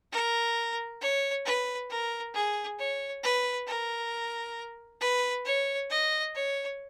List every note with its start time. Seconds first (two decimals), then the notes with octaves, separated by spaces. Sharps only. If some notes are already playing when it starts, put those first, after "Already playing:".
0.12 A#4
1.01 C#5
1.46 B4
1.90 A#4
2.35 G#4
2.79 C#5
3.24 B4
3.67 A#4
5.01 B4
5.46 C#5
5.90 D#5
6.35 C#5